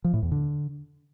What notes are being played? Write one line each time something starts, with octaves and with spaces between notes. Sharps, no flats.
F3
A2
E2
D3